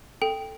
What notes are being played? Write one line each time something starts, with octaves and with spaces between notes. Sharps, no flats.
A4 G5